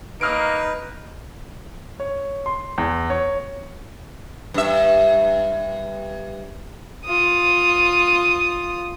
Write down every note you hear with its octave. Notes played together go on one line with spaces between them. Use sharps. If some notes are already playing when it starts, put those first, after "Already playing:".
A#3 D#4 B4 D#6 F6 D7
C#5
C6
E2
C#5
G2 E5
F4 D#6